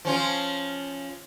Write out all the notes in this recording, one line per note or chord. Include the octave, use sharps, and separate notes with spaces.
F3 C#4 F4